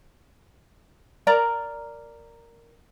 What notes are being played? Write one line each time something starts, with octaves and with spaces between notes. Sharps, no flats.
A#4 D5 A#5